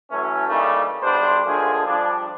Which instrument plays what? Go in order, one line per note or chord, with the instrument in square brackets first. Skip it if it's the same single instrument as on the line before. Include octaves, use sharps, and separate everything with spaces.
[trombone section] E3 F#3 A3 C#4
C#3 E3 G3 A3 A#3 D#4
B1 G3 D4 C5
D#2 D3 F3 A3 G#4
F3 G3 D4